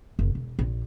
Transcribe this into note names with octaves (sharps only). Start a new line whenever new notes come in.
F#1
E1
A#1